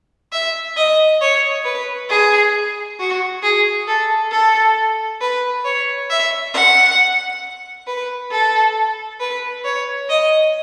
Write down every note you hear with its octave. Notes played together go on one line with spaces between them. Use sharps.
E5
D#5
C#5
B4
G#4
F#4
G#4
A4
A4
B4
C#5
E5
F#5
B4
A4
B4
C#5
D#5